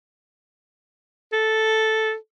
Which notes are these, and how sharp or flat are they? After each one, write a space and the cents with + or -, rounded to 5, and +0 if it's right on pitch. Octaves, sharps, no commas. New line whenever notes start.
A4 -5